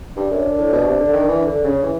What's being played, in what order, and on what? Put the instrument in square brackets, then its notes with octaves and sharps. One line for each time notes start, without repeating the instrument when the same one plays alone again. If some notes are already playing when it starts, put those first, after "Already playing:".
[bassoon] G2 [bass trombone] D4
[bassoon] F#2
A2
B2
C3
D3
D#3
E3
D3
C#3
E3